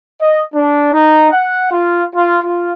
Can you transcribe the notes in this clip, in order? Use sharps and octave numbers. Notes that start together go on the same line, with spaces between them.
D#5
D4
D#4
F#5
F4
F4
F4